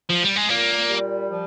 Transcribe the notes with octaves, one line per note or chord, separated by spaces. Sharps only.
F3
G3
G#3
A#2 A#3
G3
F3